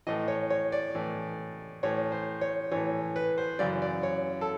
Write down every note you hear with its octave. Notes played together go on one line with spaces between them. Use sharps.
A2 E3 D#5
C#5
C#5
D5
A2 E3
A2 E3 C#5
C5
C#5
A2 E3 C#5
B4
C5
F#2 C#3 E3 D5
D5
C#5
A4